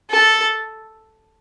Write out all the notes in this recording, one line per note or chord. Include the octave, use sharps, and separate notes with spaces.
A4